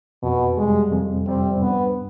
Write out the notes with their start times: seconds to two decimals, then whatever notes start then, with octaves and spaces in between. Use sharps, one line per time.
0.23 F2 B2
0.57 C3 G3 G#3
0.92 F2
1.27 C3 G3 C4
1.62 G2 B3